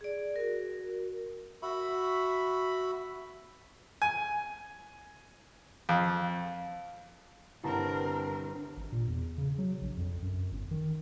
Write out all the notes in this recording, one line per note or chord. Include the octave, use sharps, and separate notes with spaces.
G#4 D5
F#4 A#4
F#4 E5 B5
G#5
F2
G1 C4 E4 A#4 A5 A#5
G#1
A#2
E2
C#3
F#3
A#1
F2
F#2
G1
D#3